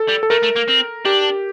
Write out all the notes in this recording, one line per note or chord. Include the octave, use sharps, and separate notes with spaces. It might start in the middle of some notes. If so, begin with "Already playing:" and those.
Already playing: A4
G3
A4
A3 A#4
A3
A#3
C4
D4 G4